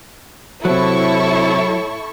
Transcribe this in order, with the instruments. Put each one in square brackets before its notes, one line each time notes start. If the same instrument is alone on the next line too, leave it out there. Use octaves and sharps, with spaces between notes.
[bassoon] A2 [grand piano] C3 C5 [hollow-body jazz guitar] F#3 [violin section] E4 A4 C#6